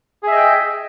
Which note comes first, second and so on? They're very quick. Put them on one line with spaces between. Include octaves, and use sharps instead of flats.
G#4 E5 D#5 G5